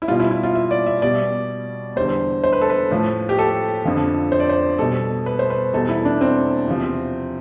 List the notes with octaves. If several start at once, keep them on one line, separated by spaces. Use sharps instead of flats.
E4
B2 G3 F4
E4
E4
F4
E5
D5
E5
B2 G3 D5
E2 D3 G3 C5
C5
B4
A4
B4
A2 F3
G4
A4
F2 D3 F3
C5
D5
C5
B2 G3 A4
B4
C5
B4
E2 B2 G3 A4
E4
D4
C4
E2 C3 F3